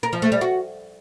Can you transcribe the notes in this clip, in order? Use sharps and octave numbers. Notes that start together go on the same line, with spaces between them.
A#4
F3
A3
G3
F#4